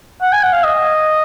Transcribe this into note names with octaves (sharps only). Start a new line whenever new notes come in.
F#5
G#5
F#5
F5
D#5